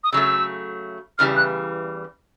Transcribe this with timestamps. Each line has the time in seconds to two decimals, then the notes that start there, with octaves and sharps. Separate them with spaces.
0.04 D#6
0.12 C#3 F#3 A3 E6
1.18 E2 C#3 E3 G3 F6
1.36 F#6